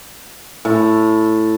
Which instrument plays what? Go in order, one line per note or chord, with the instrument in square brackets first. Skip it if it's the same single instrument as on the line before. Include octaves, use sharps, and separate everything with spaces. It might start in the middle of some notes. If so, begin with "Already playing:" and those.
[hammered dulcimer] A2